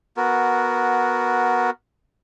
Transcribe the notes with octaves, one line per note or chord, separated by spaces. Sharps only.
B3 F#4 A#4